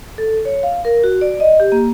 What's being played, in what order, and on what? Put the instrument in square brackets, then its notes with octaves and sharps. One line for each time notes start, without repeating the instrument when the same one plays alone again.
[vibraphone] A4
C#5
F5
A#4
F#4
D5
D#5
G4
A#3